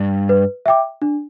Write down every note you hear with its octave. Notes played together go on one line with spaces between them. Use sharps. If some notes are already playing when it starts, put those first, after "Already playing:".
Already playing: G2
B4
E5 G5 D6
D4